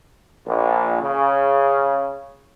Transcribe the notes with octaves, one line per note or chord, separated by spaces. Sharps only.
A#1
C#3